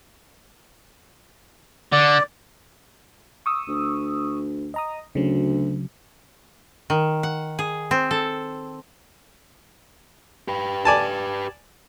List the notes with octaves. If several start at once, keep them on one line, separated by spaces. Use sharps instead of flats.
D3 D5
C#6 D#6 E6
D2
D#5 A#5 D#6
D2 C#3 F#3
D#3
F#5
G#4
C4
A4
G4 B4
D5 G#5 A5